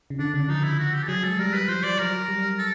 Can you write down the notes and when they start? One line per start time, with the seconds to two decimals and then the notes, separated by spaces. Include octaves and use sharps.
0.10 C#3
0.19 D3 D4
0.34 C#3 D4
0.49 F3 D#4
0.64 E4
0.79 F#4
0.94 G4
1.03 A4
1.08 F#3 G#4
1.23 G#3 A4
1.39 G3 A#4
1.54 F#3 B4
1.68 F3 C5
1.83 F#3 D5
1.99 F#3 A#4
2.29 G3
2.58 A4